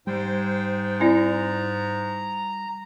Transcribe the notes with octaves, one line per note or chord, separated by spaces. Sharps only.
G#2 G3 C5 G5
C4 E4 D5 A#5